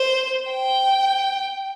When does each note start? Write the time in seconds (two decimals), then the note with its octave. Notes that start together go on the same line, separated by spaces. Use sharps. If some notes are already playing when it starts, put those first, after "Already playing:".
Already playing: C5
0.49 G5